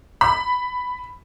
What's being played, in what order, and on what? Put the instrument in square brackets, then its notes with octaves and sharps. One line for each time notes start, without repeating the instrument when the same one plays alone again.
[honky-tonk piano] B5